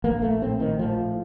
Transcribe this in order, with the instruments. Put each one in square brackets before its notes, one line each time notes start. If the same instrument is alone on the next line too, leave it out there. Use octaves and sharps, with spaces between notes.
[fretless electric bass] A#1 A#3
A3
A2 C4
D#3
A2 F3